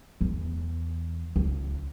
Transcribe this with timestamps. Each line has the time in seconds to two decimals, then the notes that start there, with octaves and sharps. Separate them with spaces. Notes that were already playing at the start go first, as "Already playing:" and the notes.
0.21 E2
1.36 C#2